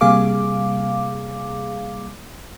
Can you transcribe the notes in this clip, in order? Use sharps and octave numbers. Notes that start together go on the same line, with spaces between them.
C3 G3 A#3 G#4 F5 D6